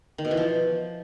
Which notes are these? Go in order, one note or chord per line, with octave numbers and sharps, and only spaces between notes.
D#3
B2
E3
F3